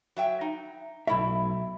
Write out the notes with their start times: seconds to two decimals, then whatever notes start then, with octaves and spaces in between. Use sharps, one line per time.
0.17 F#3 E5 G5
0.41 D#4
1.07 B1 A3 E4 E5